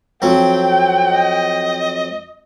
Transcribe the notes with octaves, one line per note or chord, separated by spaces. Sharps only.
F2 F#3 C4 G5
D#5